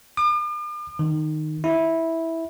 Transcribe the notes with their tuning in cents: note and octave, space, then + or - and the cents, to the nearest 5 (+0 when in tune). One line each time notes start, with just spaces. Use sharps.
D6 +45
D#3 -10
E4 -10